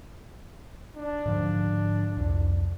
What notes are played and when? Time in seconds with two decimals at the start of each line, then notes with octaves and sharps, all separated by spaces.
0.96 D4
1.26 G#2 D3 F3
2.17 C2 F2